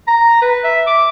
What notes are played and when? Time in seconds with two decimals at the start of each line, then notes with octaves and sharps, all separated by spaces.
0.07 A#5
0.42 B4
0.64 E5
0.87 D6